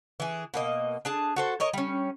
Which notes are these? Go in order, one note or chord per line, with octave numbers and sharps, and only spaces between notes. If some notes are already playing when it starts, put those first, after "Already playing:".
E3 G#4
B2 A#3 D#5
D4 G#4 A5
F#4 A4 C5
A#4 C#5 D#5
G3 C#4